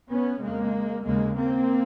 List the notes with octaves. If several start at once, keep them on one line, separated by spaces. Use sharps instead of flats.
B3 C#4
F2 C#3 G#3 A#3
D#2 C#3 G#3 A#3
A#3 C4